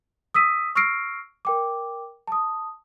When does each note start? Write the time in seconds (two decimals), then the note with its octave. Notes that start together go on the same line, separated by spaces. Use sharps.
0.34 D#6 E6 B6 D#7
0.75 C#6 E6 F6 A#6 C7 D7
1.45 A#4 G5 D6
2.27 A5 D#6